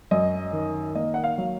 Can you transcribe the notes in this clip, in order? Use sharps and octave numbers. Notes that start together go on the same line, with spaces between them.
F#2 D#5
D#3
A#3 D#5
F#5
F5
F#3